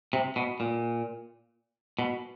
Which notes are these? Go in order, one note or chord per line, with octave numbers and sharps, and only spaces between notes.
C3
B2
A#2
B2